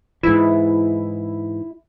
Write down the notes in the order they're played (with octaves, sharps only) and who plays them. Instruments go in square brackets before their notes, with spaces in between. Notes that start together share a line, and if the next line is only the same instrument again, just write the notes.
[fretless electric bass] G#2 E3 [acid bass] E4